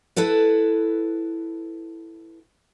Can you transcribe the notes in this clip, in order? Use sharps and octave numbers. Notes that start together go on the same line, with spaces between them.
E4 A4 B4 F#5